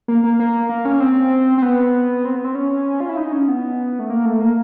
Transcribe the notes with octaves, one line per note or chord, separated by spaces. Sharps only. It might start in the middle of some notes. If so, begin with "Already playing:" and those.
A#3
A#3
A#3
A#3
C#4
C4
C4
B3
C4
B3
C4
C#4
F4
E4
D#4
C#4
B3
A3
A#3
A3
A#3